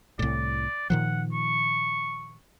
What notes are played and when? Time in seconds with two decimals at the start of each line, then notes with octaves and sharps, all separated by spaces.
0.19 C2 A2 D5
0.90 A#2 D#3 F3 F#5
1.33 C#6